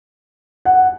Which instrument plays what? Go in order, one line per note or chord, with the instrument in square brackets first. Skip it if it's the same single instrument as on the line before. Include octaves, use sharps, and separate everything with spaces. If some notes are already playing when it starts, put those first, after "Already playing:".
[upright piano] F#5